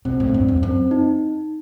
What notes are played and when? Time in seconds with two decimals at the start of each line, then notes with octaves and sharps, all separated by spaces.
0.05 B2 C4
0.20 A2
0.34 G2
0.48 E2
0.63 F#2 C4
0.91 D#4